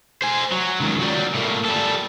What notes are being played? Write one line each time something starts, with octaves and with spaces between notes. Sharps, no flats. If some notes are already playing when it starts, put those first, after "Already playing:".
C5 G#5
F#3
C#2 D#3
F#3 G3
A2 A#3
G3 A4